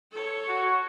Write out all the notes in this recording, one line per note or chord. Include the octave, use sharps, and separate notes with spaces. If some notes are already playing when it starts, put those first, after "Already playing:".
A4 C#5
F#4